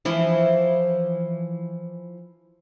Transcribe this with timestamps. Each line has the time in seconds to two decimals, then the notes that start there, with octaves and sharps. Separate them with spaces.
0.05 E3 F3 E4